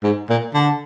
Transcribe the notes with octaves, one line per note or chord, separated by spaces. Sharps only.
G#2
A#2
D3